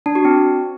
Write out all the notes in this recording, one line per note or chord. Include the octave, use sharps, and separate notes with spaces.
D4
F#4
C4